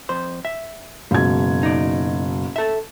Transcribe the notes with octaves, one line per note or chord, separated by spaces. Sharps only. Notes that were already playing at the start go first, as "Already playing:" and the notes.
F2 C5
E5
F#1 E2 G#2 B2 G#6
D#4 D5
A4 E5